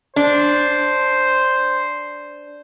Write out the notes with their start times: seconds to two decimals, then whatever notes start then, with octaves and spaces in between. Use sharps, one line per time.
0.16 D4 C5